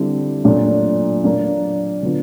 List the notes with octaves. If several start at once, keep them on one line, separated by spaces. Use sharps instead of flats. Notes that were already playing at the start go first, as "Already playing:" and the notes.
Already playing: D3 G3 C4 E4 G4
A#2 F#3 A3 D4
F#3 A#3 D4
D3 F#3 B3 D4 F4